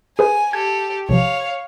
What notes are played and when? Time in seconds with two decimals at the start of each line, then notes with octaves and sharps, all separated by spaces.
0.19 G#4 B4 C5 G#5
0.53 G4 A4 G#6
1.09 A#1 C3 F3 C#5 F5